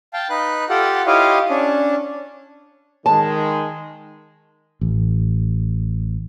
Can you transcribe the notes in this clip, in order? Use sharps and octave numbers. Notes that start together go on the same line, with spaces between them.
F5 G5 A5
D#4 B4 F#6
F4 G4 A4 F#5
E4 F4 G4 C#5 D#5 F5
C#4 D4
D#3 G#3 A5
A1